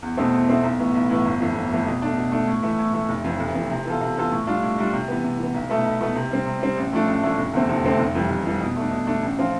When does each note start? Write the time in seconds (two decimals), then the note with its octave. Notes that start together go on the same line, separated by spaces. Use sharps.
0.02 E2
0.17 B2 A3 C4 E4
0.33 E2
0.48 B2 A3 C4 E4
0.63 B1
0.79 A2 E3 B3
0.94 B1
1.10 A2 E3 B3
1.25 G1
1.40 F2 E3 A3
1.55 G1
1.71 F2 E3 A3
1.86 B2
2.02 A3 D4
2.17 B2
2.32 A3 D4
2.47 A2
2.63 E3 A3 E4
2.79 A2
2.94 E3 A3 E4
3.09 F1
3.24 F2 E3
3.40 F1
3.55 F2 E3
3.71 C3
3.85 E3 B3 F4 A4
4.01 C3
4.16 E3 B3 F4 A4
4.32 A2
4.47 G3 D4 F4
4.62 A2
4.78 G3 D4 F4
4.93 C3
5.08 E3 B3
5.23 C3
5.39 E3 B3
5.54 B1
5.70 B2 A3 E4 B4
5.85 B1
6.00 B2 A3 E4 B4
6.15 C3
6.31 G3 C4
6.46 C3
6.62 G3 C4
6.77 A1
6.92 A2 F3 A3 D4
7.08 A1
7.23 A2 F3 A3 D4
7.39 F1
7.53 E2 D3 A3 C4
7.69 F1
7.85 E2 D3 A3 C4
7.99 F1
8.15 F2 E3 G3
8.31 F1
8.45 F2 E3 G3
8.61 B2
8.76 A3 D4
8.92 B2
9.07 A3 D4
9.23 A1
9.38 F3 C4 F4